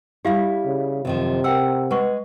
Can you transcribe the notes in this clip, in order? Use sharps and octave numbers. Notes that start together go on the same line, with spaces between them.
G3 E4 G4 F5
C#3
F#2 C3 D#3 F3
A#4 F#5 G5 E6
G#3 B4 F#5 C#6